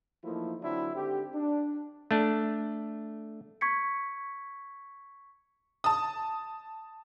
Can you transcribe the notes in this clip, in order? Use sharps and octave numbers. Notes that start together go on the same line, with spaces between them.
E3 F3 A3 A#3 D#4 E4
D3 F#3 C4 D4 E4
G#1 D3 C4 G4
D4
A3 D4
C#6 G#6 B6 C#7
A5 D#6